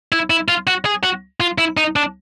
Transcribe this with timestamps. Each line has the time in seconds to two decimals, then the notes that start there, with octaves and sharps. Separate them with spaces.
0.12 E4
0.30 E4
0.48 F4
0.67 F#4
0.85 G#4
1.03 F#4
1.40 F4
1.58 E4
1.77 D#4
1.96 D4